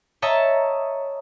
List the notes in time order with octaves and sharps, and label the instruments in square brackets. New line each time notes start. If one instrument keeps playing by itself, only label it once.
[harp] C#5 D#5 E5 A5 A#5